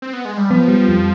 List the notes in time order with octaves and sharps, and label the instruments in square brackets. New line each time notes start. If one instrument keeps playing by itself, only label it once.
[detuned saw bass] C4
B3
G#3
G3
[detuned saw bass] F3 [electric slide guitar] B3
[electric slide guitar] G3
F2